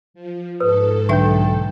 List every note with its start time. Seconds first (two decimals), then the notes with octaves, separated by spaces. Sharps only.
0.14 F3
0.60 G#2 A4 B4 D#6
1.09 B1 D3 D4 E5 G5 G6